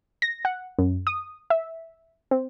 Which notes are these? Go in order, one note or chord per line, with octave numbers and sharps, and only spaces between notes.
A#6
F#5
F#2
D#6
E5
C4